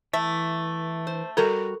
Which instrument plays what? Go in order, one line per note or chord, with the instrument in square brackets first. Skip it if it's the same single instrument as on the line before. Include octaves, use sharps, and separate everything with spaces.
[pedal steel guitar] E3 [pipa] A3 E5
[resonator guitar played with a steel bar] C5
[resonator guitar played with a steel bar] G3 F#4 A#5 [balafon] A4 A#4